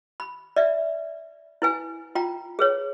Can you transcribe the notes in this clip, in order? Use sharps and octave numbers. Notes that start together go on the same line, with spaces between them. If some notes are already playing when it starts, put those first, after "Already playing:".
B5
D5 E5
E4 B4 G#5
F4 G5 A#5
G#4 B4 C#5